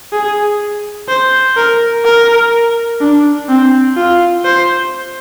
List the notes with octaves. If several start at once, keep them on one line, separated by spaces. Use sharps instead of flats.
G#4
C5
A#4
A#4
D4
C4
F4
C5